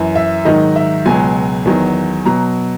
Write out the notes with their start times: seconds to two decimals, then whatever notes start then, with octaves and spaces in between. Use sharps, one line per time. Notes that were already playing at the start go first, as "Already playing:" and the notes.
Already playing: F#2 E3
0.15 E5
0.45 G#2 D#3 F#3 D#5
0.76 E5
1.06 C#2 B2 F#3 G#5
1.65 E2 D#3 F#3
2.25 B2 F#3 A#5